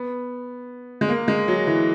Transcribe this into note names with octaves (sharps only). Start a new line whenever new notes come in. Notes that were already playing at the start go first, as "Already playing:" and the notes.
Already playing: B3
G#3
A#3
G#3
F#3
E3